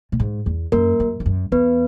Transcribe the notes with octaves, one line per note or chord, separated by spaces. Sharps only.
A#2
G#2
E2
F#2 A#3 A#4
F#2
E2
F#2
E2 B3 B4